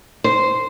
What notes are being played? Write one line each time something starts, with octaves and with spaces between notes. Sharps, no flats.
C5